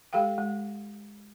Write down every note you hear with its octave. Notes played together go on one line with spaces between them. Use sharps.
G#3 G4 A4 F5 G5
G#3